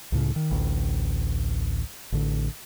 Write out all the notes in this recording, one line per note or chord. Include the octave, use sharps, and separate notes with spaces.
C#2 A2 C#3
D#3
A1 D2
A1 D3